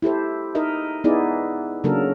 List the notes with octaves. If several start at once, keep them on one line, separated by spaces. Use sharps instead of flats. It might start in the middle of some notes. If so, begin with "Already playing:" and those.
E4 G4 A4 C5
D#4 A#4 D#5 E5
B3 D#4 E4 G#4 D5
C#3 F#3 A#3 D4 A4 A#4